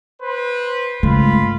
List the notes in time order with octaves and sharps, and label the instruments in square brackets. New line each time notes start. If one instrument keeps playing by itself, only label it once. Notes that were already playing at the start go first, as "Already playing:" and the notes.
[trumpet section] B4 C5
[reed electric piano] G2 C#3 A3 [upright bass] G#3 [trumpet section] F4 B5